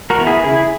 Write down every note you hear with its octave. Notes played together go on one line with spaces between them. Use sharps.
F#4 A#4
E3 B3
E4 G#4
C#3 E4 G#4